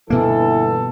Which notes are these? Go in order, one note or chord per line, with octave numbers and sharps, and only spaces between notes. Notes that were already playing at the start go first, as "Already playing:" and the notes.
G1 B2 E3 A#3 B3 A4